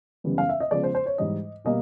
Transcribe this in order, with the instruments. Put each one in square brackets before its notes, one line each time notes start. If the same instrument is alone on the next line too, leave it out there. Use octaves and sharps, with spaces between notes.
[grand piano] F#2 C#3 E3 G3 B3
F5
E5
D#5
C#3 F3 G#3 B3 D5
C5
C5
C#5
G#2 E3 G3 D#5
B2 G3 A#3 D#5